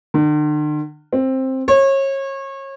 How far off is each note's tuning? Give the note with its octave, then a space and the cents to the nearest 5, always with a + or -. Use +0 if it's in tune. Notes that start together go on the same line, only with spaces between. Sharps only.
D3 +45
C4 +10
C#5 -30